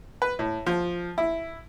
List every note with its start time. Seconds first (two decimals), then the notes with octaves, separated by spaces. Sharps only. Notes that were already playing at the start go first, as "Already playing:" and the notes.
0.22 B4
0.39 A2
0.66 F3
1.18 E4